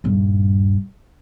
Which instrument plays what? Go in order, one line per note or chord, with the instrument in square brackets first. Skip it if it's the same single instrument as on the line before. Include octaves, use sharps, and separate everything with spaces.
[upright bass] D#1 G2